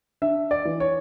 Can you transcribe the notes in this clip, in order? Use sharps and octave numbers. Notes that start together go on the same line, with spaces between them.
D4 E5
D5
E3
C#5